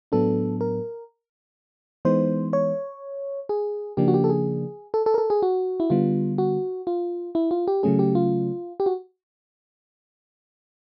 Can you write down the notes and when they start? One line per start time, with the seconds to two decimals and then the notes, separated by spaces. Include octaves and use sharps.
0.12 A2 F#3 B3 D4 A4
0.61 A#4
2.05 E3 G#3 B3 D#4 C5
2.53 C#5
3.49 G#4
3.97 C#3 F3 A#3 D4 G4
4.08 F#4
4.14 G4
4.24 A4
4.30 G#4
4.94 A4
5.06 A4
5.14 A#4
5.18 A4
5.30 G#4
5.42 F#4
5.80 E4
5.90 D3 G3 B3 F4
6.38 F#4
6.87 F4
7.35 E4
7.51 F4
7.68 G4
7.83 C#3 F#3 A3 C#4 G#4
7.99 G4
8.15 F4
8.80 G4
8.86 F#4